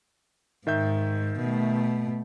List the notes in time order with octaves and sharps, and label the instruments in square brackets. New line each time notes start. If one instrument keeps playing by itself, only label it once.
[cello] G#2 [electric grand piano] D#3 E5 G6
[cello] B2 A3